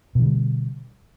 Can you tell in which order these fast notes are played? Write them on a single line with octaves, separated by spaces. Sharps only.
B2 F3 D3 G3